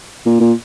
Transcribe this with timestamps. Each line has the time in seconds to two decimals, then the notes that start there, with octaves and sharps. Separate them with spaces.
0.26 A#2
0.40 A#2